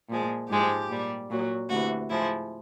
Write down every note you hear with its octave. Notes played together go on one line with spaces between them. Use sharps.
A#2 F3 G#3
G#2 F3 G#3 G4
A#2 G3
A#2 F#3
D2 C3 E3 F#4
A2 F3 G#3 E4